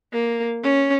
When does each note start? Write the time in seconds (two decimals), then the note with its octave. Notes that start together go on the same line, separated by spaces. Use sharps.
0.13 A#3
0.63 C#4